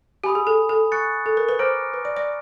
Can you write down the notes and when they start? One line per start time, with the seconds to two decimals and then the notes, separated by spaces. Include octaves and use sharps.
0.24 G4 G#5 B5 D#6
0.35 G#4
0.47 A4
0.69 A4
0.92 G#5 C#6 F#6 A6 C#7
1.26 A4
1.37 A#4
1.49 B4
1.59 C5 A#5 D6 F6 A#6 D7
1.94 B4
2.05 D5
2.16 D5